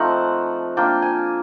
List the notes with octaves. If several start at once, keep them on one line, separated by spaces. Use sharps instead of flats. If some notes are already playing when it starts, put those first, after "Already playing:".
Already playing: F3 A3 C4 D#4 F#5
A#3 D4 F4 G5
G#5